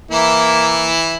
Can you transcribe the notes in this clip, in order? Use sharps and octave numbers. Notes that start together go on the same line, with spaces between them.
E3 A#3 E4